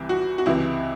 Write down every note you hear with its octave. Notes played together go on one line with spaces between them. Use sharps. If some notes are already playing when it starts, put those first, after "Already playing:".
Already playing: C2 C3 E3
F#4
F#4
C#2 C3 E3 E4